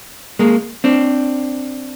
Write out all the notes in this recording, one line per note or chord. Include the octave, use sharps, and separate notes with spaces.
G#3 A#3
C4 D4